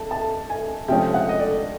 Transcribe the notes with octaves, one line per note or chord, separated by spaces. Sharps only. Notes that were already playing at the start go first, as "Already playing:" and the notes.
Already playing: A5
A5
G#5
C3 F3 G#3 C#4 G5
F#5
D#5
D5